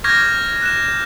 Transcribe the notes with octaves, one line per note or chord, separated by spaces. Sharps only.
C#6 D6 F6 G6 G#6 A#6
F#6 E7